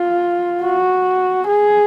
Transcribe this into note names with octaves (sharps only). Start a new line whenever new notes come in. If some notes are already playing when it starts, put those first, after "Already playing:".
Already playing: F4
F#4
G#4